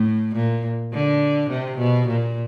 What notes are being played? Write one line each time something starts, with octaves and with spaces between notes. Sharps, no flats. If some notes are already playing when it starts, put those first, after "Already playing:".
Already playing: A2
A#2
D3
C3
B2
A#2